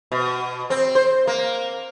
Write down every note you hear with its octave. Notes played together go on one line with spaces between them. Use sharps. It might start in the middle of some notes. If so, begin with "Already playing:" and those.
B2
C4
C5
A#3